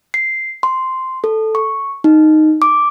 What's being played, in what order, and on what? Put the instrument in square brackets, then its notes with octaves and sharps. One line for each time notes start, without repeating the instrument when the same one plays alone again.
[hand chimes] C7
C6
A4
C#6
D#4
D6